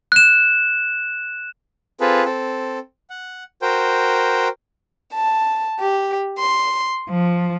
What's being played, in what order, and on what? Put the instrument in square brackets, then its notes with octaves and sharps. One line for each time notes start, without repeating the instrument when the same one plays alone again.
[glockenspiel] F#6 E7
[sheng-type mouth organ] C4 F4 G#4 A4 B4
C4 A4
F#5
F#4 A#4 C5 G5
[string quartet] A5
G4
C6
F3